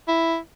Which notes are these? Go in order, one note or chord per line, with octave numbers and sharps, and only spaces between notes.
E4